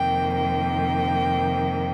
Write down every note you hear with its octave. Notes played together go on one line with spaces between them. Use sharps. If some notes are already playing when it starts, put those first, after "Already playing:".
Already playing: F2 C3 D#3 A#3 G5
G5